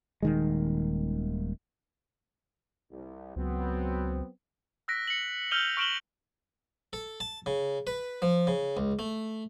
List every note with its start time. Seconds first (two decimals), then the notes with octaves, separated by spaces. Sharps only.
0.23 D#1 D#3 G#3
2.92 C2
3.36 C#2 F#3 B3 C4
4.88 E6 F#6 A#6 B6 D7
5.07 C#7 F#7
5.51 E6 F6 G6 D#7 F7 G7
5.77 C#6 F6 D7 E7 F#7 G7
6.93 A4
7.20 A5
7.46 C#3
7.87 B4
8.22 F3
8.47 C#3
8.77 C#2
8.99 A3